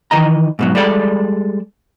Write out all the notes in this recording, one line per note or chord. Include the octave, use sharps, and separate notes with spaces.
D#3 E3 D#5 A#5
G#2 B2 F#3
G3 G#3 A4 D5